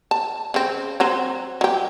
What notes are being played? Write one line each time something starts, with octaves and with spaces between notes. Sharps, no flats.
A5
C#3 C4
F#3 C4 C5
F#3 G4